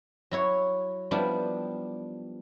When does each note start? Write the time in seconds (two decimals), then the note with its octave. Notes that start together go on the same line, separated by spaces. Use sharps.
0.31 F#3 E4 C#5
1.11 F3 G3 B3 D4 E4